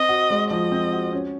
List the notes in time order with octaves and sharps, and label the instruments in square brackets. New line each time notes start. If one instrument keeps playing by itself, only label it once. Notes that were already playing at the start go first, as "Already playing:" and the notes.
Already playing: [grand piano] C4 [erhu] D#5
[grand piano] F#4
G#3
[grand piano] F3 [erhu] D#5
[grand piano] C4
F#4
C#4